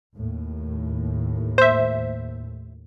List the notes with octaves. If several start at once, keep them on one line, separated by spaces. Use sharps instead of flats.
D#2 A2
C5 E5